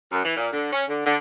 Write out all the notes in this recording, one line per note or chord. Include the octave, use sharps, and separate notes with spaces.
F#2
E3
A#2
D3
C#4
D3
D3